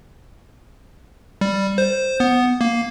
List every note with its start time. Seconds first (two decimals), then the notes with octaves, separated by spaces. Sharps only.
1.41 G3
1.78 C5
2.20 B3
2.61 A#3